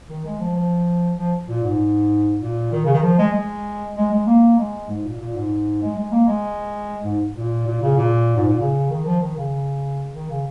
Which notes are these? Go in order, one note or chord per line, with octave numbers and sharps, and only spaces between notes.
D#3
G#3
F3
F3
F3
A#2
G#2
A#2
D#3
C#3
D#3
F3
G#3
G#3
G#3
G#3
A#3
G#3
G#2
A#2
A#2
G#2
G#3
G#3
A#3
G#3
G#2
A#2
A#2
C#3
A#2
G#2
A#2
C#3
D#3
F3
D#3
C#3
D#3
C#3